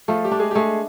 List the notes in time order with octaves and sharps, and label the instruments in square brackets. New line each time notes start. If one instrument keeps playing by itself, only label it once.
[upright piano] F3 F4 [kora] A3
[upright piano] G3 G4
[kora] D4
[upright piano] G#3 G#4
G4
[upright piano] G#3 G#4 [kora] A3